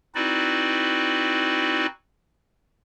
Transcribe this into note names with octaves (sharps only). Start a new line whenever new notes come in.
C4 D#4 E4 F#4 B4 D5